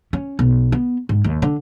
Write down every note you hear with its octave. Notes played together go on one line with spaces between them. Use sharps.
C#4
B1
B3
G#2
D#2
D3